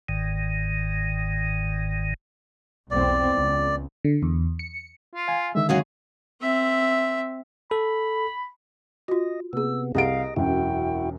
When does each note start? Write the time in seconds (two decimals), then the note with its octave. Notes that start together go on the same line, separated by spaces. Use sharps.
0.09 G1 G#2 D#3
2.91 B1 E2 C4 D5
3.35 C#2
4.04 D3
4.23 E2
4.59 C#7
5.15 F4
5.28 F5 G#5
5.55 D3 D#3 G#3 E5
5.69 F#2 F#4 G#4 F5
6.42 C4 E5
7.71 A4 B5
9.08 F4 F#4 D#5
9.53 C3 A#3 B3 G#4 E6
9.95 C2 G4 G#4 D#5 F5 F#5 D7
10.36 E1 F#2 E4 F#4 G5